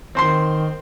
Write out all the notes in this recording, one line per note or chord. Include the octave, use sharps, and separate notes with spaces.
D#3 C4 C5 C6